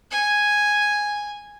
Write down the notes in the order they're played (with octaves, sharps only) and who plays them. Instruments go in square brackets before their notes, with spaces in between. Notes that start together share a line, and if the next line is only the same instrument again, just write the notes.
[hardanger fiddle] G#5